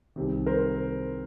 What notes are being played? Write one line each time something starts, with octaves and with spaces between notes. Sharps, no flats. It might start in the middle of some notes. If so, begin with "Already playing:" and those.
C2 C3 D#3
A#4 C5